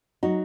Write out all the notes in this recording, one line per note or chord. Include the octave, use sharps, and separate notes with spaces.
F#3 D#4 F#4